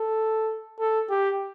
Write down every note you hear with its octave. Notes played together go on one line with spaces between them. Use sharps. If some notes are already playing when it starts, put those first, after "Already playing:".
Already playing: A4
A4
G4